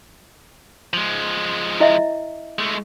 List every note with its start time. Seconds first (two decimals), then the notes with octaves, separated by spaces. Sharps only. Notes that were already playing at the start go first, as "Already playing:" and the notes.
0.93 F3 G#3
1.80 E4 D#5 E5
2.59 G#3 A3